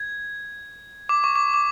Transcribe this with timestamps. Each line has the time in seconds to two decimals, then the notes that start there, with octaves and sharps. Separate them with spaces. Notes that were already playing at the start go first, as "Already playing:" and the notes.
Already playing: G#6
1.09 D6
1.24 C#6
1.35 D6
1.54 D6